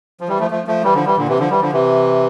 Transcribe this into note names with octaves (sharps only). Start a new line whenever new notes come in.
F3
E3 G3
F3 A3
F3 A3
F3 A3
E3 G3
D3 F3
E3 G3
A#2 D3
C3 E3
D3 F3
E3 G3
D3 F3
C3 E3